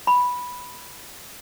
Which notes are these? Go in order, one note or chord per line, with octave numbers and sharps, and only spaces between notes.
B5